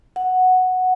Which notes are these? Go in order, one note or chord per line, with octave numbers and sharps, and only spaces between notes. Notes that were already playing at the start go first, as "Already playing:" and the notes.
F#5